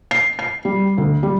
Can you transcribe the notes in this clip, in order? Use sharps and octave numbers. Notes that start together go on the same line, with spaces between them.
C7
C7
G3
D2
G3